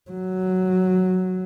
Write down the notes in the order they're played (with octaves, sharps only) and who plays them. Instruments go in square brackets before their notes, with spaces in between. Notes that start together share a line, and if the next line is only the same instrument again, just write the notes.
[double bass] F#3